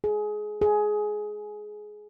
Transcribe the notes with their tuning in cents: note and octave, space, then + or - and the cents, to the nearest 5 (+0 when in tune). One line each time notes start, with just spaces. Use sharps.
G#4 +20
G#4 +15